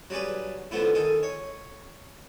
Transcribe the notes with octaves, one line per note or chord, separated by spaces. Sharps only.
F#3 G3 D4 G#4 B4
D3 E3 F3 A3 B3 E4
D#3 G#4 A4
C#5